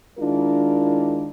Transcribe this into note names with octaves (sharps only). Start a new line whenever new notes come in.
D#3 G#3 D4 E4 F4 A#4